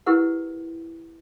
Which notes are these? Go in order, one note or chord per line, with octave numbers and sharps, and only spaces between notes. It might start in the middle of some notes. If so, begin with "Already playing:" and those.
E4 G4 A#4 B4 F#5